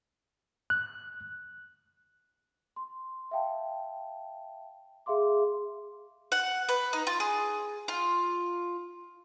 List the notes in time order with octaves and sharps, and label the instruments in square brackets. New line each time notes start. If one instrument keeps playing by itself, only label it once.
[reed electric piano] F#6
[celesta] C6
E5 F5 G5 A5
G#4 E5 F5 C6 D6
[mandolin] F#5
B4
D#4
F4
G#4
F4